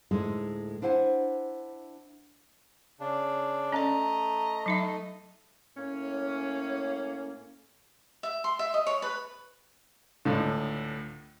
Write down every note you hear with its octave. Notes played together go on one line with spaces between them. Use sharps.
D2 A2 G#3 D#4 G#4 A4
D4 E4 C5 F#5 G#5
C#3 D4
A3 C#4 D5 D#5 A#5
F#3 D#4 E5
A2 A#3 C#4
E5
C6
E5
D#5
C#5
B4
C#2 A2 D3